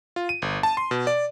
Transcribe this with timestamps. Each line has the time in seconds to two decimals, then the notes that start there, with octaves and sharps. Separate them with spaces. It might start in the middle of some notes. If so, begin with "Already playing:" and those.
0.16 F4
0.29 D#7
0.42 G1
0.63 A5
0.77 C6
0.91 B2
1.07 D5